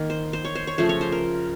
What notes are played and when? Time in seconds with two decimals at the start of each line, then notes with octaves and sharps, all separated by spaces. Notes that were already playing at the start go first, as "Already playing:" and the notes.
Already playing: D#3 A#3
0.10 C5
0.33 C5
0.45 C#5
0.55 C5
0.67 C#5
0.78 C#3 F3 A3 C5
0.89 C#5
1.01 C5
1.12 A#4